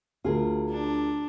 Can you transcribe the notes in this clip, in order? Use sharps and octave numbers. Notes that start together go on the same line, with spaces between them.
D2 F4 G#4 A#4
D4